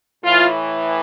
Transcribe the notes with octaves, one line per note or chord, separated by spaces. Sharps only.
A2 E3 F4